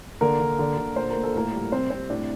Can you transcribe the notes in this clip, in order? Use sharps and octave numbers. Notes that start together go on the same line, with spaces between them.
D3 A#3 A#4
D3
D3
D3
A#2 C5
A#4
A#2
A4
A2 A#3 A#4
G3
C3 C4 C5
C3 C4 C5
A2 D4 D5